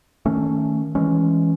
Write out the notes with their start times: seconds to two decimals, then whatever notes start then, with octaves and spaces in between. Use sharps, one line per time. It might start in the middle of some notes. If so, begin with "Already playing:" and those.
0.26 D#3 A3 C#4
0.95 E3 G#3 C#4